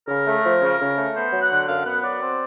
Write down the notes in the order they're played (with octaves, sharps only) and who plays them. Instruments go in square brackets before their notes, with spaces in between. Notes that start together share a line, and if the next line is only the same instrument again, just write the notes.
[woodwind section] C#3 A#4
A3
F3
C#3
C#3
A3
B3 C5
F#3
F#5
D3
F#2 F5
B3 F#5
F#3 D5
C4